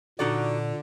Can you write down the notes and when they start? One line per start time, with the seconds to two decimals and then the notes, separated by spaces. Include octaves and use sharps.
0.19 A#2 D3 D#4 F#4 D5